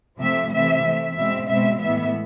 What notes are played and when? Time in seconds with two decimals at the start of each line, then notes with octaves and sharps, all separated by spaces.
0.20 C3 F3 A3 C4 E5
0.53 C3 E3 A3 C4 E5
0.85 E3 A3 C4
1.17 B2 G#3 C4 E5
1.49 B2 G#3 C4 E5
1.82 A2 E3 G#3 B3 E5